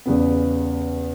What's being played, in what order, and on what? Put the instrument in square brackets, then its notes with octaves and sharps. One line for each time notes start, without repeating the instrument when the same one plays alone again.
[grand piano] E2 C#3 G3 B3